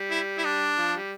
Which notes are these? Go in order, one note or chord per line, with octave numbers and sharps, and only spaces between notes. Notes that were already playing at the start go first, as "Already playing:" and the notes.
Already playing: G3
E4
E4
D4
F3
G3